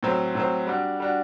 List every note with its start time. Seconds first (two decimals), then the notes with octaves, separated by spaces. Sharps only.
0.03 A2 F#3 C4
0.35 A2 F#3 C4
0.67 G3 D4 F#4
1.00 G3 D4 F#4